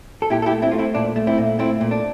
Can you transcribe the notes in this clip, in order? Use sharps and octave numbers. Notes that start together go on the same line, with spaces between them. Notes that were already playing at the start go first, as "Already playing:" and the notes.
A4
A#2 E4 G4
A4
E4 G4
A3
C4 E4
A3 F4
C4 E4
A#2 D4
A3
C4 E4
A#2
A3 C4 E4
A#2
D4